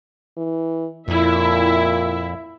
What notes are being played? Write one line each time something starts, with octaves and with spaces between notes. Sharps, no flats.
E3
F2 A#2 E4 E5